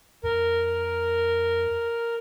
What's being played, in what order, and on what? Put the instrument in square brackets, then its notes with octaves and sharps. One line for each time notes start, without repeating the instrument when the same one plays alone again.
[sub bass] F2 [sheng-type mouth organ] A#4